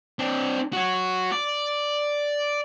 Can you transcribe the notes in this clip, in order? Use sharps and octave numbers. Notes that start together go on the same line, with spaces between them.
C4 D4
F#4 C#5
D5